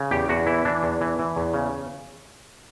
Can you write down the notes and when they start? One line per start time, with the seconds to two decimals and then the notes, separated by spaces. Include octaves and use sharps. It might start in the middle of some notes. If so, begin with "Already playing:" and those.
Already playing: C#3
0.11 E2 G4
0.29 E2 F#4
0.47 E3 E4
0.65 E3 D4
0.83 E2
1.01 E3
1.19 E3
1.36 E2
1.54 C#3